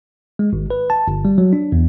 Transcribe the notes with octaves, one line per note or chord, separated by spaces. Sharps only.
G#3
G#1
B4
A5
G1
G3
F#3
D4
E2